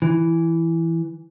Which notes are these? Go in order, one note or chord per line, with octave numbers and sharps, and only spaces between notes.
E3